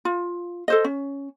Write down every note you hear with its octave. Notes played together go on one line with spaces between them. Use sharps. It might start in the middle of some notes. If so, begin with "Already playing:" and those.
F4
A4 C5 D#5
C#4